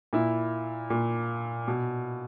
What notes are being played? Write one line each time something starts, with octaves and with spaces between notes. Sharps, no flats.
A#2 E4
A#2
B2